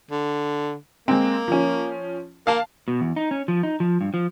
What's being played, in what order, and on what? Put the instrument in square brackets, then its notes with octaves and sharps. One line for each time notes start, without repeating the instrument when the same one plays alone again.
[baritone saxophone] D3
[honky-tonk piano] G#3 C4 [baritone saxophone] A#3
[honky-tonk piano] F3 C#4
[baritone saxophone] A#3 [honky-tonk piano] F5 A5
[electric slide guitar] B2
E2
D#4
C#4
F3
D#4
F3
G2
F3